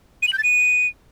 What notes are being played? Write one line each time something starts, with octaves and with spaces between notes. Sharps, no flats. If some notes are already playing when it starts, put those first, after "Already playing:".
D#7
F#7
G6
A6
D#7